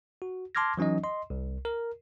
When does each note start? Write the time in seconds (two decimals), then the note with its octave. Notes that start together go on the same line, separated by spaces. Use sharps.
0.22 F#4
0.55 A5 C6 D6 F6 G#6 A#6
0.77 E3 F#3 C#4 D#4 D#5
1.03 D#5 C6
1.30 C2
1.65 A#4